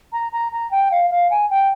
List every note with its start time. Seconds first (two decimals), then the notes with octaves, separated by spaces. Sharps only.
0.13 A#5
0.32 A#5
0.52 A#5
0.71 G5
0.92 F5
1.10 F5
1.31 G#5
1.50 G5